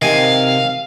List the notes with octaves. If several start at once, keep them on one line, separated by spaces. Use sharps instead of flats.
C3 D#3 F5 G#5